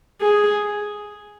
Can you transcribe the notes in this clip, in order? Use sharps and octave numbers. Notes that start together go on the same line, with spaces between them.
G#4